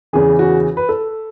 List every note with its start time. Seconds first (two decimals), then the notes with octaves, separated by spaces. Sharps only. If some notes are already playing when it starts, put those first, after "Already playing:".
0.13 E2 C#3 E3 G#4
0.39 F#4
0.77 B4
0.89 A4